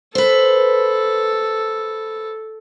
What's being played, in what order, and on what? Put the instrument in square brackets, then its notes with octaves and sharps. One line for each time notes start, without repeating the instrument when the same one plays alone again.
[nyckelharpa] A4 [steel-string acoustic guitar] B4 C5